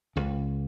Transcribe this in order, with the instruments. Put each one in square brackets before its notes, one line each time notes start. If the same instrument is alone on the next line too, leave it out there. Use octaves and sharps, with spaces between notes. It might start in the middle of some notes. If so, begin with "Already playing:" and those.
[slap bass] C#2 C#3